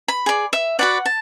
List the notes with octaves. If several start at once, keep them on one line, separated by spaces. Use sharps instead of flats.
B5
G#4 D5
E5
F#4 B4 D5 F#5
A5